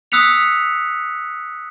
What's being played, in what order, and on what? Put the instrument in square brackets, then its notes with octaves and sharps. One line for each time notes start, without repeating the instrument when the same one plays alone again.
[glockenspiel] D#6 E6 F#6 B6 C#7 F7